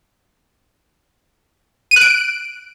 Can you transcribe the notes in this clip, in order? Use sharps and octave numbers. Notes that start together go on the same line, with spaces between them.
D#7
F#6
D7